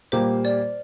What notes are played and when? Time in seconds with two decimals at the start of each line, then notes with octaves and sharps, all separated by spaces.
0.12 A#2 G3 A#3 G4 C5
0.45 D5